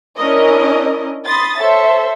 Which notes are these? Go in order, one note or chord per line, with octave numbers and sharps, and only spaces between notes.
C#4 D4 E4 A#4 D#5
B5 C6 D#6 A6
A4 C5 C#5 E5